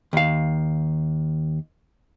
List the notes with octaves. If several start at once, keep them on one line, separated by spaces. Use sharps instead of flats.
D#2 F5